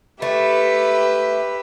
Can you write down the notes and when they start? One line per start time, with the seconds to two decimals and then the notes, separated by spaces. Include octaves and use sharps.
0.22 A3 G4 B4 E5